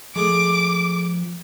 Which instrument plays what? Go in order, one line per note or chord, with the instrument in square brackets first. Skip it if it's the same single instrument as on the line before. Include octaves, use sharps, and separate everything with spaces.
[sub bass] F3 [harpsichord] G#3 A3 G#4 [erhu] D6